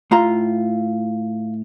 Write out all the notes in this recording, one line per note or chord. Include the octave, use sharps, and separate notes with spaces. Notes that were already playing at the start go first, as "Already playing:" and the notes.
A2 F4 A#5